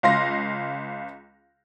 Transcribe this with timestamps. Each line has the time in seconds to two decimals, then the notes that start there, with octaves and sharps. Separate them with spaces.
0.03 C#2 F5 C6 A#6